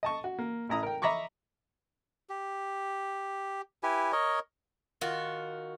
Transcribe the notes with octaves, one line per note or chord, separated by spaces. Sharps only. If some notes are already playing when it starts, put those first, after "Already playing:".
D#5 A5 C#6
F#4
A#3
A1 E4 A#5 D#6
A#4 G5
D#5 E5 A#5 B5 C#6 D6
G4
E4 G4 B4 G#5
A#4 C#5 D#5
D#3 F4 F#4